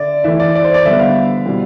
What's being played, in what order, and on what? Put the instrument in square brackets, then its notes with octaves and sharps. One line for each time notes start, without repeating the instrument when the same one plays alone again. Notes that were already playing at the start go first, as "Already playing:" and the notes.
Already playing: [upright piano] D3 [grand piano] D5 E5
[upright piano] E3 A3 E4 [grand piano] E5
[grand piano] D5
D5
C5
D5
[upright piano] D3 G3 B3 [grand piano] E5
[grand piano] F5
[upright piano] B2 G3 C4 E4